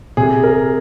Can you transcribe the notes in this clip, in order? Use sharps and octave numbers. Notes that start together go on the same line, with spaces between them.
C3 G#4
A#4